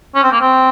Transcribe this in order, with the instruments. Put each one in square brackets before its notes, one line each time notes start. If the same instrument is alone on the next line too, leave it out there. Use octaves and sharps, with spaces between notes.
[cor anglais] C#4
C4
A#3
C4